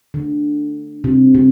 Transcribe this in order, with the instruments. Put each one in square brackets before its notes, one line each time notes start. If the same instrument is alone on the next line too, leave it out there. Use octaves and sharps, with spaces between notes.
[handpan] D3
C3
C3